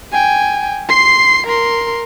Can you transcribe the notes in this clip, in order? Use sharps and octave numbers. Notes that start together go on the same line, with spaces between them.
G5 G#5
C6 C7
A#4 C6